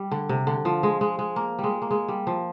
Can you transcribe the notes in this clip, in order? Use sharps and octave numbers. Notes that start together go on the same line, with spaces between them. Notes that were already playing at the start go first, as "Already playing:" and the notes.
Already playing: G3
D3
C3
D3
F3
G#3
G#3
G#3
A#3
G3
G#3
A#3
G#3
G3
F3